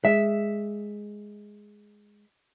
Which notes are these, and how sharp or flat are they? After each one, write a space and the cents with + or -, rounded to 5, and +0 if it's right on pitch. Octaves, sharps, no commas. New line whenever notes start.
G#3 +0 E5 +0